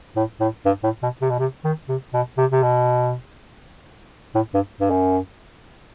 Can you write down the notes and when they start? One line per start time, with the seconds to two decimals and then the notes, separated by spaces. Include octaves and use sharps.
0.16 A2
0.40 A2
0.66 G2
0.84 A2
1.03 B2
1.22 C3
1.30 B2
1.39 C3
1.65 D#3
1.89 C3
2.14 B2
2.38 C3
2.52 C3
2.63 B2
4.35 A2
4.54 G2
4.80 G2
4.91 F#2